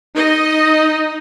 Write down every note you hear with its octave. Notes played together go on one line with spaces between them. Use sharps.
D#4 D#5